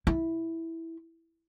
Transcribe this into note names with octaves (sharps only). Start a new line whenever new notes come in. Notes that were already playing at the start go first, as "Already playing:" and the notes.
E4